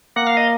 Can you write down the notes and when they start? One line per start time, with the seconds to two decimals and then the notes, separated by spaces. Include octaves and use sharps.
0.16 A#3 F#5
0.27 F5
0.37 D#5